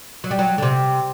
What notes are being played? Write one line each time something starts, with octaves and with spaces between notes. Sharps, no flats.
F#3
G3
F#3
D3
C3